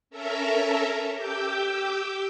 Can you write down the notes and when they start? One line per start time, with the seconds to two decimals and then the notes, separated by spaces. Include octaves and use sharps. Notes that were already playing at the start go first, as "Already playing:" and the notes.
0.10 C#4 A4 A#4 E5 A#5
1.15 G4 D6 E6 G6